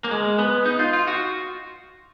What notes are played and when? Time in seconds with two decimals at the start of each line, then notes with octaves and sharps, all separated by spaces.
0.04 A#3
0.11 G#3
0.39 B3
0.65 D#4
0.79 F4
0.93 F4
1.07 F#4